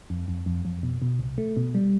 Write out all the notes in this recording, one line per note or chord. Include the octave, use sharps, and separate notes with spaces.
F2
F2
F2
F2
B2
B2
C2
A3
B2
G3